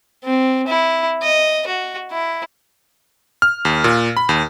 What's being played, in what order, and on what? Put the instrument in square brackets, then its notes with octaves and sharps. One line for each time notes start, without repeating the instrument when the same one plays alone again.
[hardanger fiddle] C4
E4
D#5
F#4
E4
[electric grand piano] F6
D#2
A#2
B5
D#2